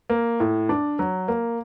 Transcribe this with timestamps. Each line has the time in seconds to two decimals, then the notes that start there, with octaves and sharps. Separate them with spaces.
0.10 A#3
0.40 A2
0.69 D4
0.99 F#3
1.28 A#3